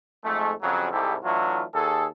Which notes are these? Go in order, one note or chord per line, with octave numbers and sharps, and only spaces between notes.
F2 G#2 G#3 A3
F2 C#3 F#3
C2 G#2 C3 E4 G4 A4
E3 F#3 A3 D4 E4 F4
D#2 G#4 A4